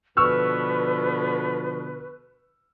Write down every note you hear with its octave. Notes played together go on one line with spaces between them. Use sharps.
B2 D3 F3 B4 C#6 E6 F6